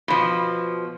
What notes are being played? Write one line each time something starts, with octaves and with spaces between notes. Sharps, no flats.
B2 F3